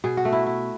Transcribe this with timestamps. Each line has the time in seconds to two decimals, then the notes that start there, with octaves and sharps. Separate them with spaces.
0.04 B2 G#4
0.17 F#4
0.25 A3
0.32 E4
0.47 E4